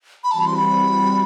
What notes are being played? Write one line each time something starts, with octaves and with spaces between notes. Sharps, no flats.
B5
E3 G3 C4 F#4 A5
B5
C6
B5